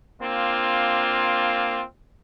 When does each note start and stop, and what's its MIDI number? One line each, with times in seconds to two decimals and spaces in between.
0.21 1.82 58
0.21 1.82 60
0.21 1.82 62
0.21 1.82 65